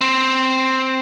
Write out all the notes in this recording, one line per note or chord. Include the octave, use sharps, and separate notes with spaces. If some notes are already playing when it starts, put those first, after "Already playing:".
C4